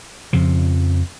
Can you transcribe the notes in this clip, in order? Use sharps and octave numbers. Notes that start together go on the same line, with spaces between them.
F2 C#3 F3